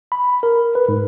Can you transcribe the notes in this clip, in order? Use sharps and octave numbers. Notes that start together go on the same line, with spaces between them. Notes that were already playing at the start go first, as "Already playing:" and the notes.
B5
A#4
B4
G#2